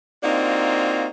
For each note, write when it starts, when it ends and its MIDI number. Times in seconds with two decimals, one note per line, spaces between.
0.23 1.07 58
0.23 1.07 60
0.23 1.07 62
0.23 1.07 63
0.23 1.07 65
0.23 1.07 66